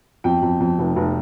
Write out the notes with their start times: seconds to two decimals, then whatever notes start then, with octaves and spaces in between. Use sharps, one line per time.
0.24 F2 G5
0.42 F2
0.60 F2
0.79 F1
0.96 F1